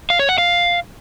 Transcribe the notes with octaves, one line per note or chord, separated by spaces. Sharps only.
F5
C#5
F#5
F5